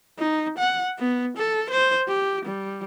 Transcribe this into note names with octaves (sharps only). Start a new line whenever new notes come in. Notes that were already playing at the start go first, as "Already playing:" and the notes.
D#4
F#5
B3
A4
C5
G4
G3